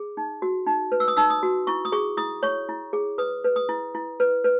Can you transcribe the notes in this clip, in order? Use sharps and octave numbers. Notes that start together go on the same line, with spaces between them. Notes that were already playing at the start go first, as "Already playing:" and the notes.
Already playing: G#4
D#4
F#4
D#4
B4
E6
D#6
D#4 E6
D#6
F#4
E4 C#6
D#6
G#4 C#6
E4 D#6
C#5 C#6
E4
G#4
B4 D#6
B4
D#6
E4
E4
B4
B4